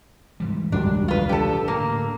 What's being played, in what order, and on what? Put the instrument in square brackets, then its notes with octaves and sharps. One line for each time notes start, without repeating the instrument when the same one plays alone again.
[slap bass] G#2 E3 G3
[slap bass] E1 C#2 D#3 [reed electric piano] F#2 F#3 G3 [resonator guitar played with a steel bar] D4
[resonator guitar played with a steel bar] F4 B4
[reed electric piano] D4 [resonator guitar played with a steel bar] G4 A4
[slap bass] A2 D3 [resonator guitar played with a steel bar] A#3